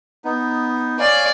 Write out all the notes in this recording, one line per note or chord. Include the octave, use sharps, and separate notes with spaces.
B3 D#4
C#5 D5 F5 G#5